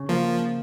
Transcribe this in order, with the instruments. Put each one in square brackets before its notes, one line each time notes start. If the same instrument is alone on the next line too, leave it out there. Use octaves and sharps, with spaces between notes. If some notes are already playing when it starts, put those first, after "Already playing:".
Already playing: [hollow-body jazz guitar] C#3
[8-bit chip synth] F3 [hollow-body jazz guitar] A#3